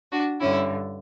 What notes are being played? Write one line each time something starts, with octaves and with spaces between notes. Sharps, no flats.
D4 F#4
G2 D3 C#4 E4